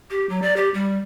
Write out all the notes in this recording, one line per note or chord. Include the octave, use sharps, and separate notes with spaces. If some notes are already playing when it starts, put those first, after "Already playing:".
G4
F#3
D5
G4
G3